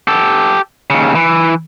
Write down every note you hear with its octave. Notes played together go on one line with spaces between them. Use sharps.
G4 A4
D#2 C#3
E3